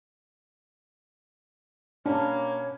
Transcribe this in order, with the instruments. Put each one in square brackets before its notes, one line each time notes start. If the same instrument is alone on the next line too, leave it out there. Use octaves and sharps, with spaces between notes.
[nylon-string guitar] B2 C#4 [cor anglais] A#3 [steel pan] D4 [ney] C#5